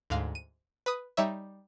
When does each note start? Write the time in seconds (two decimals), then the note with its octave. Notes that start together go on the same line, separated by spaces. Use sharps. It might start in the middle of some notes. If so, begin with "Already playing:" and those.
0.10 D2 G#2 F5
0.35 D#7
0.86 B4 B5 D#6
1.17 G3 D#4 C#5 E5